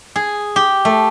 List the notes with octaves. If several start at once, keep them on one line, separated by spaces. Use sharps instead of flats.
G#4
G4
A3